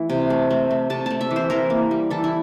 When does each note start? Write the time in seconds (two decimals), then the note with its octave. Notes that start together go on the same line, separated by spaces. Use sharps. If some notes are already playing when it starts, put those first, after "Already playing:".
Already playing: E3 A3
0.10 C3
0.30 A3
0.50 A3
0.71 A3
0.90 C3 A5
1.06 A3 A5
1.21 E5
1.31 E3
1.36 C5
1.50 E3 A#4
1.70 A#3
1.91 G3
2.10 E3 A4
2.24 E4